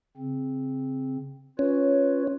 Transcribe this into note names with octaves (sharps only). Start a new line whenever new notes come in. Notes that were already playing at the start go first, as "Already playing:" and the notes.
C#3 C4
C#4 F4 B4 C#5